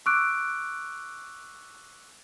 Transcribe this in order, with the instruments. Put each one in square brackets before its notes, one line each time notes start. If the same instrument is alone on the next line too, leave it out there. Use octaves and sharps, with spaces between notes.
[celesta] C#6 D6 E6 F#6 D7